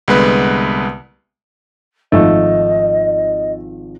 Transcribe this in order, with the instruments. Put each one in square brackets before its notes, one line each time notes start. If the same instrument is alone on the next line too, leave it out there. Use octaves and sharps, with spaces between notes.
[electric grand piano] C2 D3 G#3 B3 B4
[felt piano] G#1 F3 [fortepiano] A3 [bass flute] D#5